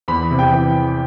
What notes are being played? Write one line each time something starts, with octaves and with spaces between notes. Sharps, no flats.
E2 B5
C3
G5
E3